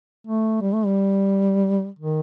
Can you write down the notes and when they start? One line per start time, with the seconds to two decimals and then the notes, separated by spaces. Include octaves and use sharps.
0.27 A3
0.61 G3
0.74 A3
0.86 G3
1.99 D#3